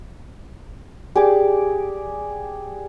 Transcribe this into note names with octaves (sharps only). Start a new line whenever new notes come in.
G4 G#4 D5 D6